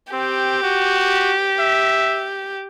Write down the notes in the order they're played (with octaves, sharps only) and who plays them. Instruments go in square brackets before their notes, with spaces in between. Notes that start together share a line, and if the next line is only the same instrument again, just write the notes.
[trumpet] C4 [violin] G4
[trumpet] F#4
E5